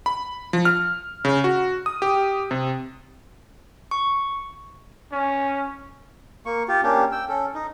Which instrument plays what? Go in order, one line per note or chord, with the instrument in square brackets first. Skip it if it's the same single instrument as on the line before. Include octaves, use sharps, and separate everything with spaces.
[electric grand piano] B5
F3
F6
C#3
F#4
D#6
G4
C3
[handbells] C#6
[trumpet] C#4
[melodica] A#3 C#6
F4 G4
A#3 C#4 D4 G4
G5 E6
C#4 A4
D#4